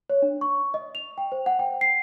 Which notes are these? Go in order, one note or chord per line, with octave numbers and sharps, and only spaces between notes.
C#5
D4
C#6
D#5
F7
G5
C5
F#5
G5
C7